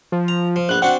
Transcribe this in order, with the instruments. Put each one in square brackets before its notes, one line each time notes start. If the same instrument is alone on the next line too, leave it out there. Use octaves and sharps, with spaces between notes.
[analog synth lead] F3
[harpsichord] A#5
F3
[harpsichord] A#1 B3 [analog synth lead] F#6
[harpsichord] C4 D4 F#4 [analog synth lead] F#5